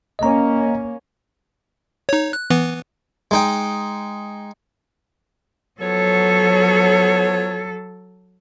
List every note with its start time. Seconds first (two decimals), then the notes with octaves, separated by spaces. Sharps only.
0.19 A#3 C#4 D#5 A#5
2.09 D#4 C#5
2.33 F#6
2.50 E3 B3 B4
3.31 G#3 D#4 G5
5.81 F3 F#3 B3 A4 C#5